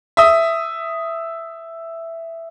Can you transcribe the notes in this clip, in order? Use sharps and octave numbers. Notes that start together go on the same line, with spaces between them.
E5 D#6